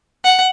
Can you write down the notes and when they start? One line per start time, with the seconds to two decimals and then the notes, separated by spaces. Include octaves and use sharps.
0.24 F#5